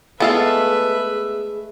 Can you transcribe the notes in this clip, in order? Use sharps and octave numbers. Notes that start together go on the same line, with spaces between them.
G#3 A3 B3 G#4 A4 B4 E5 F5